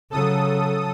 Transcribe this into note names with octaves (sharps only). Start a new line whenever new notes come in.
C#3 F#3 A4 D#6